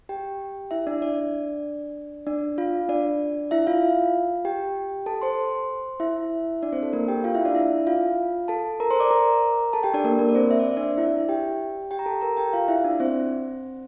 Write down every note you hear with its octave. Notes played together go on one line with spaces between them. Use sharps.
G4 G5
E4 E5
D4 D5
D4 D5
D4 D5
F4 F5
D4 D5
E4 E5
F4 F5
G4 G5
A4 A5
C5 C6
E4 E5
D4 D5
C4 C5
A4
A#3 A#4
G4 G5
F4 F5
E4 E5
D4 D5
E4 E5
F4 F5
A4 A5
A#4 A#5
C5 C6
D5 D6
A#4 A#5
A4 A5
G4 G5
D4 D5
A#3 A#4
A#3 A#4
D5
C4 C5
E5
D5
C5
D4 D5
E4 E5
G4 G5
G4 G5
A#5
A4 A5
A#4 A#5
G4 G5
F4 F5
E4 E5
D4 D5
C4 C5